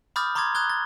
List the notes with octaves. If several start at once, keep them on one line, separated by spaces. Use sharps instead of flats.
B5 D6 D#6 F6 G6 A6
A#5 C6 D6 D#6 G#6 A6
A#5 D#6 F#6 G#6 G7
A6